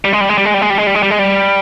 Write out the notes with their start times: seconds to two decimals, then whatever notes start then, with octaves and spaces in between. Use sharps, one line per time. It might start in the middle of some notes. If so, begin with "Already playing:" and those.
0.05 G3
0.13 G#3
0.21 G3
0.29 G#3
0.38 G3
0.45 G#3
0.54 G3
0.62 G#3
0.70 G3
0.78 G#3
0.87 G3
0.95 G#3
1.03 G3
1.10 G#3
1.19 G3